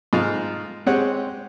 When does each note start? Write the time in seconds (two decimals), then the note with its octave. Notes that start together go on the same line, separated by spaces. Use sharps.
0.13 G#2 F4 F5
0.86 G#3 C4 G4 C#5 F#5